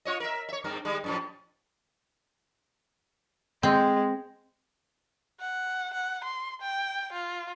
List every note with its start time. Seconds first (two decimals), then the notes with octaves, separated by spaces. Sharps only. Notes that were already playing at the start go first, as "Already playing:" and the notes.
0.05 F4 C#5 D#5
0.20 A#4 E5
0.49 C#5 E5
0.64 G2 C4 A#4
0.85 D#3 G3 G#3
1.04 F#2 A2 F3
3.63 G#3 C4
5.40 F#5
5.93 F#5
6.24 C6
6.61 G5
7.13 F4